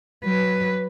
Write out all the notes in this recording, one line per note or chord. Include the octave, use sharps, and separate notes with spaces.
F#3 B4